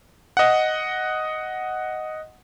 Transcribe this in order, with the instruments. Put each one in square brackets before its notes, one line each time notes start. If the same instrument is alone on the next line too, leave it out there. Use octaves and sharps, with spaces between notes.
[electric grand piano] D#5 F#5